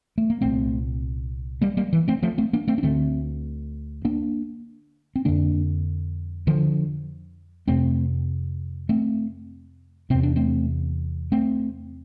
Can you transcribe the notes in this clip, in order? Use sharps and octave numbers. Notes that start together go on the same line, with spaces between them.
A3
A#3
C2 A#2 A3 C4
G3 A#3
G3 A#3
E3
A3 C4
F3 A3
A3 C4
A#3 D4
A3 C4
D4
D2 D3 A3 C4
A#3 D4
C4
F2 D3 A#3 D4
D3 F3
F2 C3 A3 C4
A3 C4
E2 C3 C4
D4
A3 C4
A3 C4